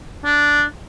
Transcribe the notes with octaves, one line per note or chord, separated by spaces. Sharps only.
D4